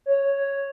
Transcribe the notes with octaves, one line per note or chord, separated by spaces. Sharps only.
C#5
C#5